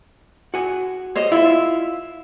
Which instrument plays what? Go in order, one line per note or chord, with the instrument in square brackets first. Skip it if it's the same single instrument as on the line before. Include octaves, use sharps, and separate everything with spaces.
[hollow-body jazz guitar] F#4 G#5
[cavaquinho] C5 C#5 D#5
[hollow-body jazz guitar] E4 F4 [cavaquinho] E5